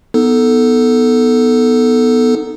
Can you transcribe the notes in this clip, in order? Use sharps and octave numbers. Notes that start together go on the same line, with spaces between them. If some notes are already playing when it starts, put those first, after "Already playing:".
B3 D#4 A4